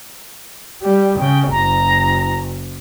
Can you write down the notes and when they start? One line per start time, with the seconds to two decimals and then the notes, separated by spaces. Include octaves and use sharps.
0.82 G3
1.19 C#3 G5
1.51 F#1 A#5